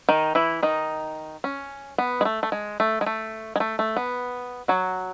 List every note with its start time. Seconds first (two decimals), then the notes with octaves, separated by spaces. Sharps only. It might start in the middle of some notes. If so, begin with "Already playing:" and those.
0.09 D#3 D#4
0.35 E3 E4
0.62 D#3 D#4
1.44 C#4
1.98 B3
2.21 G#3
2.25 A3
2.43 A3
2.52 G#3
2.80 A3
3.01 G#3
3.06 A3
3.56 G#3
3.60 A3
3.79 A3
3.96 B3
4.68 F#3 F#4